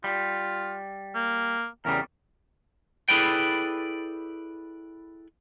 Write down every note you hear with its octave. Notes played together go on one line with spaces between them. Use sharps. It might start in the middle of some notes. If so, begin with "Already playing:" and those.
G3 F4
A#3
E2 C#3 G3 A#4
E4 G#4 A4 B4 D5 G5